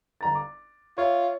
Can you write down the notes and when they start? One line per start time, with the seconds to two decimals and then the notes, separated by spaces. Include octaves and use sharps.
0.21 G1 A#5 A6
0.35 D6
0.98 F4 C#5 E5